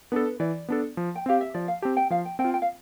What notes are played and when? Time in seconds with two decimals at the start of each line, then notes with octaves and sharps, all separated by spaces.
0.12 B3 D4 A4 B4
0.40 E3 D5
0.69 B3 D4 A4
0.97 F3
1.15 G5
1.26 C4 G4 F5
1.41 E5
1.54 F3 D5
1.68 F5
1.82 C4 G4 A5
1.97 G5
2.10 F3 F5
2.25 G5
2.39 C4 G5
2.44 F4
2.54 G5
2.62 F5